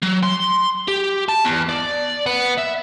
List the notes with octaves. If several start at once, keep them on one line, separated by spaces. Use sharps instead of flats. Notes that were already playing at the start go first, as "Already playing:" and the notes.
F#3
C6
G4
A5
E2
D5
B3
E5